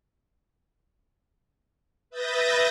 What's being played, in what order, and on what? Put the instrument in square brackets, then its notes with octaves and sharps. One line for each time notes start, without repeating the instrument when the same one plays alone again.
[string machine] B4 E5 D#6 G6 A6 A#6